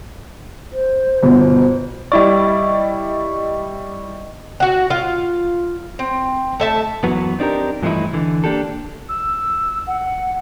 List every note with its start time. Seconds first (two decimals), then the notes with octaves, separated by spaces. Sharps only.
0.73 C5
1.23 G1 B2
2.12 G3 E4 D5 D#5 C#6
4.60 F#4 F#5
4.90 F4
5.99 C4
6.60 A3 E5 A5
7.04 F#2 E3 F#3 B3
7.39 C4 D4 D#4 G4 A#4
7.83 G2 E3 F3 A3 D#4 E4
8.13 D3 E3
8.44 A#3 D4 G4 A4
9.09 E6
9.87 F#5